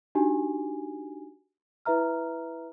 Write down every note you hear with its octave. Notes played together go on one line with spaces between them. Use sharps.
D4 D#4 F#4 G4 G#5
E4 B4 E5 A#5 F6